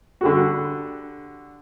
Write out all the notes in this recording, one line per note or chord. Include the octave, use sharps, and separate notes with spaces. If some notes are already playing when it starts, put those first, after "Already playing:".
D3 G3 F#4